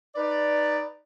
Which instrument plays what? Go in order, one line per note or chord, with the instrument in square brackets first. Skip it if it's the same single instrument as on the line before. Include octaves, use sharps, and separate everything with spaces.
[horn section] D#4 B4 D5